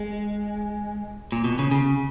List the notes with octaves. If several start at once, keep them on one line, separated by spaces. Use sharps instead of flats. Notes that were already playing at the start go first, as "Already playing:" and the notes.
Already playing: G#3
A#2
B2
C#3
C#3